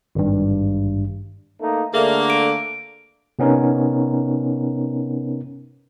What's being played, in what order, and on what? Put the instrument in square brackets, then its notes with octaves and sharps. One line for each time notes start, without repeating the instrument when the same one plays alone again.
[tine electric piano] G#1 G2
[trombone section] A3 A#3 D#4
[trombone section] D3 [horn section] A3 A#3 [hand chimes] G#4 E5
[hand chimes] D7
[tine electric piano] C3 B3 C#4 D#4 A#4